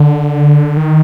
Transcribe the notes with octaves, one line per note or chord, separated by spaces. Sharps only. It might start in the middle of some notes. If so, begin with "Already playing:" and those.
Already playing: D3
D#3